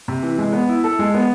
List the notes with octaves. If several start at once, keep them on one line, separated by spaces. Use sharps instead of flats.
C3
E3
G#3
B3
E4
A4
G#3
B3